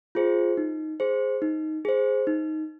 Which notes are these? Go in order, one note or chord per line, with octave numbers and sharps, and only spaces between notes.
F4 G#4 C5
D#4
G#4 C5
D#4
G#4 C5
D#4